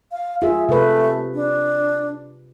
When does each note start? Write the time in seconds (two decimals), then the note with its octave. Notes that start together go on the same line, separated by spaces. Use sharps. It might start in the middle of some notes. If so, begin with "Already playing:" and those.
0.12 F5
0.42 F4 G#4 E5
0.69 C3 A3 B4
1.34 D4